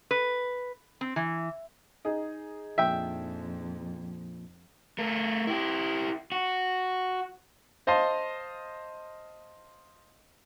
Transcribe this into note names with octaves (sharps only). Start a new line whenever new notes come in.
B4
C4
E3
D#4 G#4 D#5
F2 A#2 F3 D4 E5 G5
A3 A#4
E4 G4
F#4
C5 D#5 F5 A5 C6